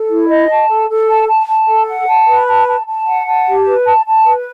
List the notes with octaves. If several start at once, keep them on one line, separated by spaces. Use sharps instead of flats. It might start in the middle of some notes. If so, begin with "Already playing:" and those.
Already playing: A4
E4
D#5
A5
A4
A4
A5
A5
A5
A4
F#5
A5
B4
A5
A5
A5
F#5
A5
G4
B4
A5
A5
B4